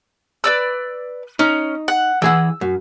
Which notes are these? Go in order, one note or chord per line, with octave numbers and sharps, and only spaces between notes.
B4 D5 E6
C#4 D#4
F#5
E3 G#4 F#5 E6
F#2